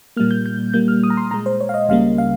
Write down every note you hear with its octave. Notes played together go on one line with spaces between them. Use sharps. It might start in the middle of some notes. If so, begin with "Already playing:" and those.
A#2 G3 A#3 F6
G6
G6
A#2 G3 A#3 G6
F6
D#6
A#5
C6
A#2 G#3 A#5
C5
C#5
F5
D#5
C#2 C#3 G3 A#3 F5
F5